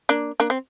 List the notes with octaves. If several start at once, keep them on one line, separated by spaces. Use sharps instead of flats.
A#3 D4
A#3 D4
C4